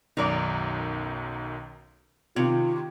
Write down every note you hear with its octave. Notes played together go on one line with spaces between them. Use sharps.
B1 F#2 D#3 D#4 D5
C3 D#3 F4 G#6